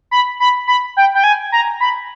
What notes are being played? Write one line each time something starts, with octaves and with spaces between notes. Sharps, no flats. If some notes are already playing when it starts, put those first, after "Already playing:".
B5
B5
B5
G5
G5
G#5
A#5
B5